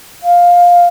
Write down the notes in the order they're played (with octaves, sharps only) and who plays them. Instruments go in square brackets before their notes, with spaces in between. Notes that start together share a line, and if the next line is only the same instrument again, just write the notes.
[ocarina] F5